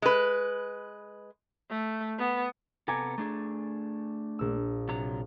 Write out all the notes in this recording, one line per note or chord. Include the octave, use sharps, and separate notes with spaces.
G#3 B4
A3
B3
C3 B3 A4 G#5 A#5 D6
A3 D4 G#4
A#1 E6
C3 F#3 A#5